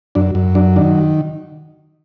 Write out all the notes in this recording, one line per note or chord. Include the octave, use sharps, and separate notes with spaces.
F#2 D4
F#2
F#3 D4
D#3 D4